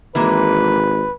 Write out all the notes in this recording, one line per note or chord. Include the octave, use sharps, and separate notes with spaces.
G#1 E3 G#3 A#3 B4